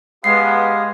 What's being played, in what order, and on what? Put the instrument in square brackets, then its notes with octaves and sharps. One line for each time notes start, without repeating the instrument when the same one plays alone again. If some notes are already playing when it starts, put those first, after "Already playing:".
[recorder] G#3 [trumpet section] B3 [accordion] G4 F5 D#6 [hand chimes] C7